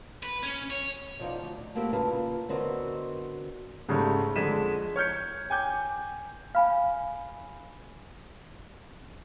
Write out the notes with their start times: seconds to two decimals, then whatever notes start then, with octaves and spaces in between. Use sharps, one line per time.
0.23 B4
0.44 C#4
0.71 C#5
1.20 B2 F3 D#4 F4 D5
1.41 D2
1.75 A3 A#3 C4 E4 F#4 G4
1.93 C#3 A#3 F4 B4 D5 A5
2.49 D3 B3 C4 F#4 A#4 D#5
3.89 G#2 C#3 G3 A3
4.36 F2 D3 G#3 B6 D#7 E7
4.96 C#5 F6 G6 C#7
5.50 G5 G#5 D6 G6
6.55 F5 G#5 B5 F6